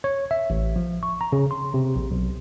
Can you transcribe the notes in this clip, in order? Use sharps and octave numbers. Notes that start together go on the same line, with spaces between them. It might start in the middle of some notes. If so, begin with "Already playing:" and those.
C#5
E5
A1
F3
C#6
A#5
C#3
C6
C3
A#1
B1